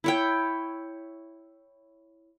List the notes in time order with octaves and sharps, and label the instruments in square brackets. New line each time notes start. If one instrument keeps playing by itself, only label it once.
[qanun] E4 C#5 G5